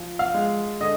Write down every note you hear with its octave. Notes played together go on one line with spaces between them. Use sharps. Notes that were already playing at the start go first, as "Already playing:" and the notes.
Already playing: F3
F5
G#3
D3 D#5